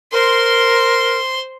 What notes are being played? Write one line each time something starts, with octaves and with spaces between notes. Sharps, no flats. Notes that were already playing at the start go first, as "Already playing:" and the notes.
A#4 C5 C6